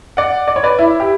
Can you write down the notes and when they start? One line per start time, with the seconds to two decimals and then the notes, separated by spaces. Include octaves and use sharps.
0.17 D5 F#5
0.48 D5
0.56 C#5
0.63 B4 D5
0.79 E4
1.00 G4